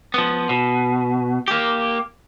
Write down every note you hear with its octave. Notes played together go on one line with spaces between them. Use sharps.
F3 B3
B2
A#3 G4